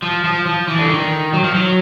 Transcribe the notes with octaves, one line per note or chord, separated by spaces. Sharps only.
F3
F3
F3
E3
D3
D#3
F#3
F3
F#3